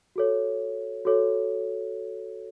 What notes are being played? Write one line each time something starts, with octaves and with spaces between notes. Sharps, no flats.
F#4 A4 C#5
F#4 A4 C#5